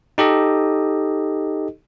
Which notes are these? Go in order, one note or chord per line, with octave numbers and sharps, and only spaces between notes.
D#4 G4 A4 D#5